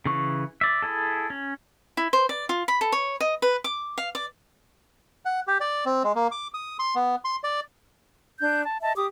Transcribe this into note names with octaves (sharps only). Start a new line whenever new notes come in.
C#3 E3 C#6
D5 E5
E4 G#4 A4
C#4
E4
C5
D5
F4
B5
A4
C#5
D#5
B4
D6
F5
D5
F#5
G4
D5
C4
G#3
A#3
D6
D#6
C6
B3
C6
D5
D4 G6
A5
D#5 E5 A5
G4 D6 D#6